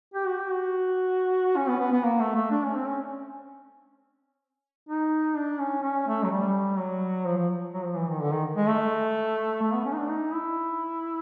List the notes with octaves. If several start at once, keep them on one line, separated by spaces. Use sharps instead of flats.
G4
F#4
G4
F#4
C#4
B3
B3
B3
A#3
A3
A3
D4
C#4
C4
C#4
D#4
D4
C#4
C#4
A3
F#3
G3
F#3
F3
F3
F#3
F3
E3
D#3
D3
D#3
G#3
A3
A3
B3
C#4
D#4
D4
D#4
E4